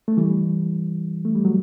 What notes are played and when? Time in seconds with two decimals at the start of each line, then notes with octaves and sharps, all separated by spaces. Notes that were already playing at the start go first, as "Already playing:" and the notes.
0.08 A3
0.17 E3 G3
1.25 A3
1.35 G3
1.45 F#3